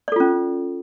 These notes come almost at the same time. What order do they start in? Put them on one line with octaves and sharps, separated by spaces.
D5 A4 F4 C#4